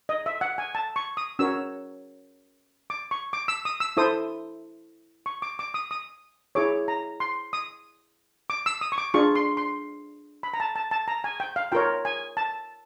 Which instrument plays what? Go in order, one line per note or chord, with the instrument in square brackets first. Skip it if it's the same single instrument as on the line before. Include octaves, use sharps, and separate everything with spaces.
[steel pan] D#5
E5
F#5
G#5
A5
C#6
D#6
C#4 F#4 A#4 C#5 E6
D6
C#6
D6
E6
D#6
E6
E4 A4 C5 D#6
C#6
D6
D6
D#6
D#6
E4 G#4 C#5 D6
A#5
C6
D#6
D6
E6
D#6
C#6
D6
D4 F4 G#4 C#6
C6
C6
B5
A#5
A5
A5
A5
A#5
G#5
G5
F5
F4 A#4 C#5 G5
G#5
A5